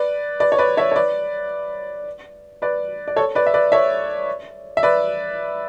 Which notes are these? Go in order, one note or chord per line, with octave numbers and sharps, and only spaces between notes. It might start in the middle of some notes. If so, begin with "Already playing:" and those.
Already playing: B4 D5
B4 D5
C#5
B4 D5
C#5 E5
C#5
B4 D5
B4 D5
D5
A4 C#5
B4 D5
E5
B4 D5
C#5 E5
E5
B4 D5